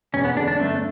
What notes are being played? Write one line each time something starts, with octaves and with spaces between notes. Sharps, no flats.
E1 C#4
B3
E2 D3 D4
D4
G1 A3